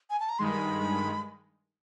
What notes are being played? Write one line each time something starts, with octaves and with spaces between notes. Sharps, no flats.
G#5
A5
A#5
G2 D#3 G#3 B5 C6